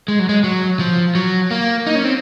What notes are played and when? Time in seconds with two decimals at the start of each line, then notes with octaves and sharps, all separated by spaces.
0.08 G#3
0.19 F#3
0.29 G#3
0.44 F#3
0.79 F3
1.15 F#3
1.51 A#3
1.87 D#4
1.95 C#4
2.04 C4